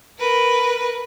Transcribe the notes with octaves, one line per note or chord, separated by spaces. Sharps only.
A#4 B4